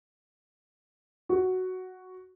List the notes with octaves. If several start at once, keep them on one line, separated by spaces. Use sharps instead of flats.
F#4